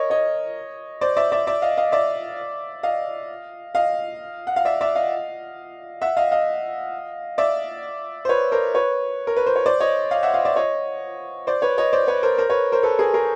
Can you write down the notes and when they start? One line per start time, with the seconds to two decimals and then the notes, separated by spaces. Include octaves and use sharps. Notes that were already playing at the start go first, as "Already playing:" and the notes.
Already playing: A#4 C#5 D#5
0.10 C#5 D#5
1.01 C5 D5
1.17 D5 E5
1.32 D5 E5
1.47 D5 E5
1.62 D#5 F5
1.77 D#5 F5
1.92 D5 E5
2.83 D#5 F5
3.75 D#5 F5
4.47 F#5
4.56 F5
4.65 D5 E5
4.81 D5 E5
4.95 D#5 F5
6.02 E5 F#5
6.17 D#5 F5
6.32 D#5 F5
7.38 D5 E5
8.25 C5
8.29 B4 C#5
8.52 A#4 C5
8.75 B4 C#5
9.27 A#4
9.36 B4
9.46 C5
9.56 C#5
9.66 C5 D5
9.80 C#5 D#5
10.11 D#5 F5
10.23 E5 F#5
10.34 D#5 F5
10.45 D5 E5
10.56 C#5 D#5
11.47 C5 D5
11.62 B4 C#5
11.78 C#5 D#5
11.93 C5 D5
12.07 B4 C#5
12.23 A#4 C5
12.38 A#4 C5
12.50 B4 C#5
12.72 A#4 C5
12.83 A4 B4
12.99 G#4 A#4
13.14 G#4 A#4